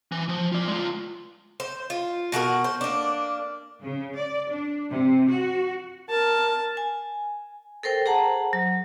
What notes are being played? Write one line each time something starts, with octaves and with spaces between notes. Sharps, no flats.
E3
F3
F4 D5
G#3 F4
C5
F4
B2 F#4 G4 A#4
C5
A#3 D4
C#3
D5
D4
C3
F#4
A#4 A5
G#5
A4 A#4 C5 G5
G#4 C5 F#5 A5 A#5
F#3